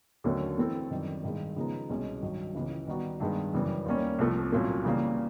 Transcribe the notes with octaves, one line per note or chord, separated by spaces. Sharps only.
D#2 D3 F#3 A3 C#4
E3 A3 C4 E4 A4
F#2 D#3 G3
G2 D#3 G#3
C#3 F3 G#3 B3 D#4
C2 B2 G#3 C#4
G2 D#3 F#3
C#2 C#3 E3
D#3 G3 B3 D#4 F#4
G2 D#3 G#3 B3 D4
F#2 C#3 E3 G3
D#2 D#3 G3 A#3 C#4
C2 C3 F3 A3
C2 A#2 F#3 A3 C#4
C#3 E3 G3 A#3